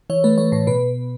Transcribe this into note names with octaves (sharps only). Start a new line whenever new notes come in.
E3 C#5
A3 B4
A3 C#5
A2 C#5
B2 B4